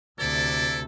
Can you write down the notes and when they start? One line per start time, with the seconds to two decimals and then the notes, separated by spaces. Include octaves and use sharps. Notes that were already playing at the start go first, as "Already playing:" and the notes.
0.19 D2 C3 E4 A4 D5